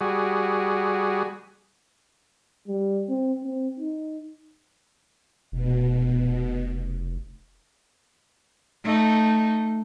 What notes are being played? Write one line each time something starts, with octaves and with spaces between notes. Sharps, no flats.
G3 F#4 G#4
G3
C4
C4
D#4
F1 B2
A3 D#4